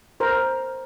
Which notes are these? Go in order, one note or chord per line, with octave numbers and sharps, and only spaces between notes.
A#4 C5